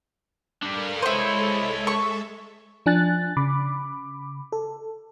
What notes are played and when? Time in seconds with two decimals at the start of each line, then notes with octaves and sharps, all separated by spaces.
0.63 G3 D4 A4 A#4 F5
1.02 G#3 E4 A4 C5 C#5 D#5 E5
1.87 C#6
2.86 F3 D4 G#5 F#6 A6
3.37 C#3 B5 D6
4.52 A4